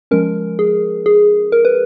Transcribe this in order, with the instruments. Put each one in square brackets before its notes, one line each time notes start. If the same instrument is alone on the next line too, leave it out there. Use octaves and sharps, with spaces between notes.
[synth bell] F3 G#3 C#4 A#4
G#4
G#4
A#4
B4